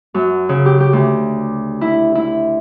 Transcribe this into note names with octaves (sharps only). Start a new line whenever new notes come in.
F#2
C#3
G4
G4
D2
E4
E4